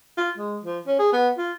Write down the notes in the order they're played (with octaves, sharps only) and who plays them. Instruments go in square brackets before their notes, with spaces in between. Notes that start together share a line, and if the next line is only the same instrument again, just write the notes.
[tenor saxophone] F4
G#3
F3
C#4
G#4
B3
F4